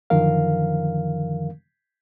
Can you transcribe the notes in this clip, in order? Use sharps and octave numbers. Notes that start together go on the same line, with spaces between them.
F#2 D3 D#3 F3 A#4 F5